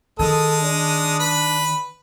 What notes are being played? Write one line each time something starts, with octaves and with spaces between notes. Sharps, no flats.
D#3 G#3 A4 D#6
D4
B4 B5